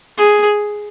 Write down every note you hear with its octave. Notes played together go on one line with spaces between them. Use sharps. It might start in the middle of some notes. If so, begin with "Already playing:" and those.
G#4